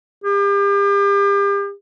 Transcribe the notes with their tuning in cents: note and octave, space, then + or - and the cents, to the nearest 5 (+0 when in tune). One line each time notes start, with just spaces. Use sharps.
G4 +40